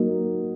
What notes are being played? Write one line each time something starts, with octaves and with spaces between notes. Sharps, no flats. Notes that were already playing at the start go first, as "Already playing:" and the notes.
Already playing: F#3 A#3 D#4